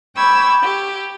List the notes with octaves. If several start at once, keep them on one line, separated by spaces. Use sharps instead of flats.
G5 B5 C#6 D6 E6 G#6
G4